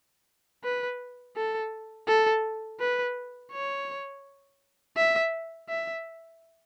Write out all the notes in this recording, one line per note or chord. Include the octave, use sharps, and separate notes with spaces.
B4
A4
A4
B4
C#5
E5
E5